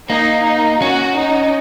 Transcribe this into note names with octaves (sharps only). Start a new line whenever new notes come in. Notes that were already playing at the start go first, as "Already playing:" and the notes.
A#3 D#4
D#4
C#4 F#4
D#4